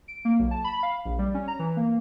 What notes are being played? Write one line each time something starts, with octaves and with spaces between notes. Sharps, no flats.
D7
A#3
B1
A5
B5
F5
A#1
G3
C#4
A#5
E3
A#3